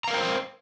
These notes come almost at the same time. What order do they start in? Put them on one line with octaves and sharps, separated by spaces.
A#5 F5 A#4 G5 C5